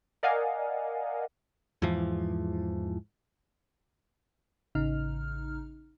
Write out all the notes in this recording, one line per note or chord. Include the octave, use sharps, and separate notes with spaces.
A#4 D5 D#5 F5 F#5 G#5
E2 G#2 E3 F3
A1 C#3 D#4 F6